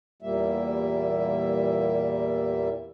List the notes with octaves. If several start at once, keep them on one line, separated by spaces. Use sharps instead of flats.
E2 A#2 G3 A#3 E5